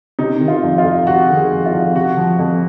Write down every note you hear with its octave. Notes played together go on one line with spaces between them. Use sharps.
C3 D#4
D#3
F4
F2
F4
F2
C3 F#4
D#3
G#4
F2
F4
F2
C3 F#4
F3
F2